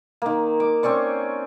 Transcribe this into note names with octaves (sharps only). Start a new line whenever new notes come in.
D#3 A#3
D6
C4 C#4 D5 C#6